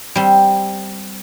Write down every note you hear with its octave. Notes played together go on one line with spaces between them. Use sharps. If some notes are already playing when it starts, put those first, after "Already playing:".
G3 C4